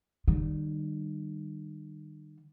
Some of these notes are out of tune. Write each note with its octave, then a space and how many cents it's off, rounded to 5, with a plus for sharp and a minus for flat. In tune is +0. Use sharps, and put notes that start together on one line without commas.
D#3 -35 G3 -5